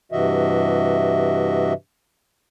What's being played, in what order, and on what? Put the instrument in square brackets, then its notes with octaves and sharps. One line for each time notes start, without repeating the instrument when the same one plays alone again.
[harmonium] G2 C3 E3 F#4 D#5 E5